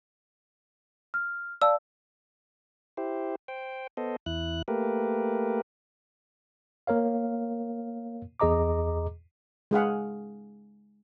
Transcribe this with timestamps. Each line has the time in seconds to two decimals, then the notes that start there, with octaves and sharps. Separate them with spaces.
1.14 F6
1.62 D5 F5 A5 E6
2.97 E4 G4 C5
3.48 C5 G5
3.97 B3 A4 C5 D#5
4.26 E2 E4 F#6
4.68 A3 A#3 G4 A#4 B4
6.87 A#3 A#4 C#5 F5
8.40 E2 G#4 D#5 A#5 D6
9.71 G#3 G#4 F5 F#5